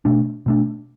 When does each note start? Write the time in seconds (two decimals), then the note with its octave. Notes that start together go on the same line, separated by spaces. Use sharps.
0.05 B2 A3 D4
0.46 B2 A3 D4